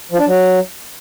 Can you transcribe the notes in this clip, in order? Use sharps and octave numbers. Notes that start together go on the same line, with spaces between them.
F3
D4
F#3